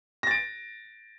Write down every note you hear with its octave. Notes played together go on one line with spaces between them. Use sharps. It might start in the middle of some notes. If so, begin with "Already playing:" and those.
A6 A#6 D7